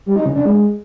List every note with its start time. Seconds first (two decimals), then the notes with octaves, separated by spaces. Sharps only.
0.06 G3
0.16 D#4
0.26 C#3
0.36 D4
0.46 G#3